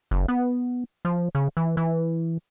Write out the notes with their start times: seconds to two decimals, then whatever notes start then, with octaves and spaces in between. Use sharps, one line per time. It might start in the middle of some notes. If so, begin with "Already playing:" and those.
0.11 F#1
0.28 B3
1.05 F3
1.35 C#3
1.57 E3
1.77 E3